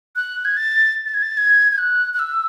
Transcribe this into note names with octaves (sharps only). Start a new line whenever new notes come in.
F#6
G#6
A6
A6
G#6
A6
G#6
G#6
F#6
F#6
E6